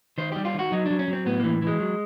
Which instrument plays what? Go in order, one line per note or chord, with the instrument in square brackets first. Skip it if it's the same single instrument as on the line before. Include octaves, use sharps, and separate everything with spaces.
[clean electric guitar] D#3 C5
G3 G4
F4
D#3 F#4
F#3 D#4
F#3 D4
C#4
F#3
C4
A2 B3
E3 A#3
E3 G#3
F#3